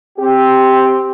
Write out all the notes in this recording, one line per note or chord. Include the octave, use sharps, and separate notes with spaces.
C4 G4